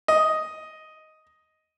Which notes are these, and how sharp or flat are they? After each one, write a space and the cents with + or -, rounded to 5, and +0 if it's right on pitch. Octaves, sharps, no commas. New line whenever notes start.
D#5 +5